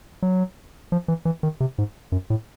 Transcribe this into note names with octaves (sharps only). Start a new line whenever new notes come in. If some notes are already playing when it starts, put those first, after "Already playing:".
F#3
F3
E3
E3
D#3
C3
G#2
F#2
A2